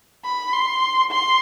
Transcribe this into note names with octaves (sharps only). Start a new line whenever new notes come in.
B5
C6
C6